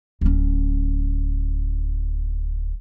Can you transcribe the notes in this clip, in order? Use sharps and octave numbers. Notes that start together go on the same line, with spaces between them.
D1 C#4